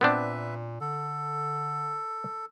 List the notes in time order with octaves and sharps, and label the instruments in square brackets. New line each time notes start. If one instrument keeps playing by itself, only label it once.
[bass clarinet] A#2 [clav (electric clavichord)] B3 C4 D4 [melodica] B4 E5
[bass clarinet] D3 [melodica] A4